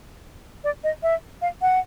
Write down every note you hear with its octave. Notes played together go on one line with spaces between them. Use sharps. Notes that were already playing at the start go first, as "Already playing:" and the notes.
D5
D#5
E5
F5
F#5